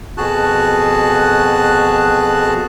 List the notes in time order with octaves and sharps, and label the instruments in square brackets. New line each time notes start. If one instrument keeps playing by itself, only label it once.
[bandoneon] F2 B2 F#4 G#4 A5 F#6